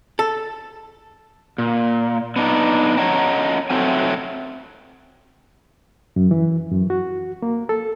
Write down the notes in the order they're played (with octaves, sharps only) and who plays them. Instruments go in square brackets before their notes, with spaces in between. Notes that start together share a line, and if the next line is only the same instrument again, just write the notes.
[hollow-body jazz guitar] A4
[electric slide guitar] A#2
B3 D4 D#4
C#4 C#5 D#5 F#5 A5 A#5
F#3 A3 C4 G#5
[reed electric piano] F#2
E3
F#2
F#4
A#3
A4